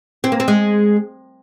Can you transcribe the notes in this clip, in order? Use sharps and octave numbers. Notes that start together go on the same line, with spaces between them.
C4
A#3
C4
G#3